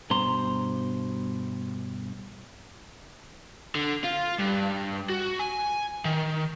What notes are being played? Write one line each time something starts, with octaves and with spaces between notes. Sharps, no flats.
G2 B2 C5 A#5 C6
D3
F4
G2
F#4
G#5
D#3